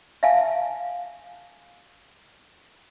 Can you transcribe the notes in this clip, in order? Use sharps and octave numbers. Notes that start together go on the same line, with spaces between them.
E5 F5 G#5 A5